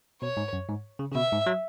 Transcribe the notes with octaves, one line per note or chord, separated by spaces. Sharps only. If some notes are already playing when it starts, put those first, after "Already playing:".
B2 C#5
G#2
F#2
G#2
C#3
C#3
B2 E5
G#2
F#3